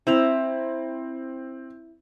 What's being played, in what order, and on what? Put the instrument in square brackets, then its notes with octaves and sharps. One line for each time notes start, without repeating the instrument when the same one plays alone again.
[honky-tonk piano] C4 [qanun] E4 E5 A#5